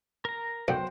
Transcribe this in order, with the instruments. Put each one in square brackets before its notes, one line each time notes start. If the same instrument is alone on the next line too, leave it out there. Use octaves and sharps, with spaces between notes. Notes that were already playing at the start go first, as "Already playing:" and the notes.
[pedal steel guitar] A#4 A#5
[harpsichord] B1 F#2 [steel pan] F#4 G5 [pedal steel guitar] C5